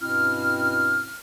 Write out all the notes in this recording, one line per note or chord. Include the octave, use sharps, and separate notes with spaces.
G2 B2 C4 C#4 E4 F6